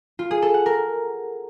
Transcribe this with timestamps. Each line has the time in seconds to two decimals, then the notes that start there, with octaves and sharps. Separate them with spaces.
0.19 F4
0.31 G#4
0.42 A4
0.54 F#5
0.66 A#4